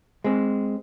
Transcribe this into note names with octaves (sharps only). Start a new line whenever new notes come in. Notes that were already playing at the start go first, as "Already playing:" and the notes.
G#3 C4